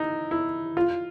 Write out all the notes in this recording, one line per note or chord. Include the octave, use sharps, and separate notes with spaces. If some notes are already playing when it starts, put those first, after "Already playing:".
Already playing: D#4 E4
E4
F4